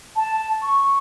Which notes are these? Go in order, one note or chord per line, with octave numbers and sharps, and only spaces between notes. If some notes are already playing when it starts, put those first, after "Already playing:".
A5
C#6